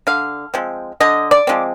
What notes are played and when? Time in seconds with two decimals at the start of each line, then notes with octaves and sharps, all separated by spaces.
0.07 D3 F5
0.54 F3 G#3 C4
1.00 D3 D#5
1.31 D5
1.47 F3 G#3 C4